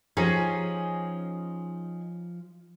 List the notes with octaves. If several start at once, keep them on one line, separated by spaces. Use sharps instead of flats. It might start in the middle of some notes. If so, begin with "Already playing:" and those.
F3 C#4 D#4 G4 G#4